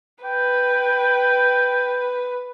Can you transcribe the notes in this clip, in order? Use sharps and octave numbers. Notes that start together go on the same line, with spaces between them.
B4 G5